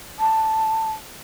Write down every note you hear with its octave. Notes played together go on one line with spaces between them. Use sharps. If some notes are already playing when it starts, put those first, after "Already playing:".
A5